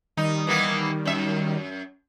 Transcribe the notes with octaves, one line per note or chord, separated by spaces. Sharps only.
D#3 G3 D#4
E3 A#3 B3
F#2 E5